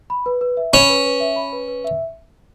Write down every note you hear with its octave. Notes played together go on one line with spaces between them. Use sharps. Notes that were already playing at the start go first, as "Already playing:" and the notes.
B5
B4
B4
E5
C#4 B5
B4
B4
E5
B5
B4
B4
E5